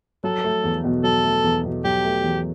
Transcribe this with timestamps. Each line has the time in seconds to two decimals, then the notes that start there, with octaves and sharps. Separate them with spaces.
0.24 F#3 A4
0.44 A3
0.64 E2
0.84 B2
1.04 F#3 A4
1.24 A3
1.44 E2
1.65 B2
1.84 F#3 G4
2.04 A3
2.24 E2